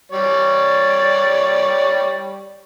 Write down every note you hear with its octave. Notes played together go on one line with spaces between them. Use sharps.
G3 C#5 D5